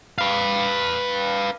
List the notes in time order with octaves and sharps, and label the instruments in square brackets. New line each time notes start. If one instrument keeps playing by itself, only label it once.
[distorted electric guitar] B4 F5